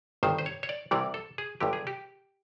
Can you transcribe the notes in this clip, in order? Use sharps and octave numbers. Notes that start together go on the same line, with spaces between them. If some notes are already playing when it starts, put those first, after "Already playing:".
G1 G2 D#3 C5
C5
C#5
C#5
D5
C2 C3 E3 G3 D5
A4
G#4
G1 G2 D3 F#3 G4
G#4
G4